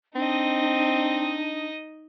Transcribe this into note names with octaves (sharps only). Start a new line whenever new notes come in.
C4 D4 D#4 D#5